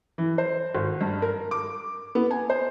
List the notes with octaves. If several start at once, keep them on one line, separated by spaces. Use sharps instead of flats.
E3
C5
G#1
G2
A#4
D6
B3
G#5
C5